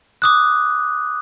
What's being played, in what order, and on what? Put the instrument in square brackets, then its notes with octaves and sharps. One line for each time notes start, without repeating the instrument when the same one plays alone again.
[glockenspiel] D6 D#6 F#6